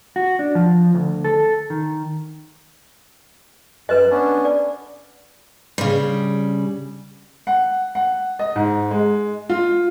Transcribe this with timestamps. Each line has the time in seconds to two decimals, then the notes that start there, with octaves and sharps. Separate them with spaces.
0.16 F#4
0.39 D4
0.55 F3
0.95 D2
1.24 A4
1.70 D#3
3.89 F#2 B4 D#5 F#6
4.10 B3 C#4 D4
4.45 D5
5.78 C#3 G3
7.47 F#5
7.95 F#5
8.39 D#5
8.56 G#2
8.91 G#3
9.50 F4